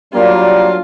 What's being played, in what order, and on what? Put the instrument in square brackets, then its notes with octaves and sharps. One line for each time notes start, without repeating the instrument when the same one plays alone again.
[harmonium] F#3 D4 [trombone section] G3 A#3 [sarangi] F4 [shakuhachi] D5